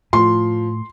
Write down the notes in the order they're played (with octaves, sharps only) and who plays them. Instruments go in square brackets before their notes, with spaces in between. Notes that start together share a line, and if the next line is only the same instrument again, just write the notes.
[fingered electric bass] A2 [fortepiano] F3 [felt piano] C6